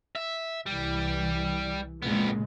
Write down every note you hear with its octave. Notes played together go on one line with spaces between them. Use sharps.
E5
C2 E3 G3
F2 A#2 C#3 G#3 B3